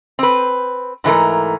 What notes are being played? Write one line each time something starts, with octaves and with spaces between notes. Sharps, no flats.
C4 B4
G#2 E3 A3 A#4